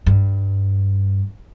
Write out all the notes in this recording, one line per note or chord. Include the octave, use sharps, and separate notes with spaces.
G2